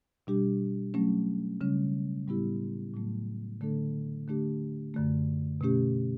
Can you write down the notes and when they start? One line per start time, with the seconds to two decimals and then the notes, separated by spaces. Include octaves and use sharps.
0.27 B2 G3 D4 G4
0.94 F#3 A3 C#4
1.61 C#3 G3 C#4
2.28 A2 G3 B3 E4 G4
2.94 A2 F#3 A3
3.61 D3 A3 D4 A4
4.28 D3 A3 D4 G4
4.94 F#2 D3 A3
5.61 B2 A3 C#4 G4